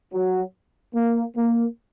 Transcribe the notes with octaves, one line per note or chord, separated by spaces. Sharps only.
F#3
A#3
A#3